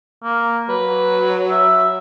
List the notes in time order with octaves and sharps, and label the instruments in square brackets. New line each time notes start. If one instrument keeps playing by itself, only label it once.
[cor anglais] A#3
[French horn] F#3 [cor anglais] B4
[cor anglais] E5